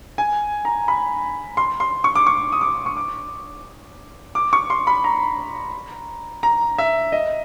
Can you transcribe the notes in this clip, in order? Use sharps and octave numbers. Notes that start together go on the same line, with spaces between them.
G#5
A#5
B5
C6
C6
C#6
D6
C#6
D#6
D6
C#6
D6
D6
C#6
C6
B5
A#5
A#5
E5
D#5